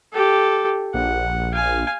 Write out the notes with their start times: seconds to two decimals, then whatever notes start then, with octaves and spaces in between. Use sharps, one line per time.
0.13 G4 A4
0.94 A#1 F#5
1.53 F5 G#5